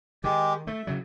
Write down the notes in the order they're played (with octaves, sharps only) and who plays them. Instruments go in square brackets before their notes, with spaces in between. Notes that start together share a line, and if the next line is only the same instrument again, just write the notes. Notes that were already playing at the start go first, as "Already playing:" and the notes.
[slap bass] D#3 [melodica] G#3 G4
[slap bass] A3 [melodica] E5
[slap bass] C#3 F#3